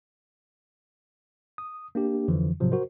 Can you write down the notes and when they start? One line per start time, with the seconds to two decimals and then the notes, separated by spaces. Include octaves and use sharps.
1.58 D#6
1.95 A#3 D4 G4
2.28 F2 D3 E3 F3
2.60 G#2 C3 F3 F#3
2.72 F#4 A#4 C5